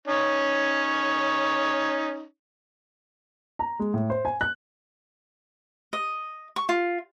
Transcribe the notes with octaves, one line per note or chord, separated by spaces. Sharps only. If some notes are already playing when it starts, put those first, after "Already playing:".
C#4 D#4 C#5
A#5
G#3
A2
C5
G#5
F#6
D#5
C#6
F4